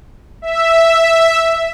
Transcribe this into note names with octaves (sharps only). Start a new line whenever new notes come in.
E5